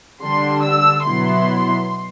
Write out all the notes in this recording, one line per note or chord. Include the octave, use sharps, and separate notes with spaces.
D3 G3 D4 C6
E6
B2 F#3 B3 E4 C6